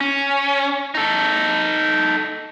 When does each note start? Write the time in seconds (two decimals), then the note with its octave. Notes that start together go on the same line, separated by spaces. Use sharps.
0.01 C#4
0.95 D#4 A4